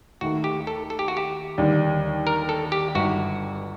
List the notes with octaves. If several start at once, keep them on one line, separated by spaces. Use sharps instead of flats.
D#2 D#3 A3 F#4
G4
A4
A4
G4
F#4
G4
D#2 D3 G3
A#4
A4
G4
G1 G2 D#3 F#4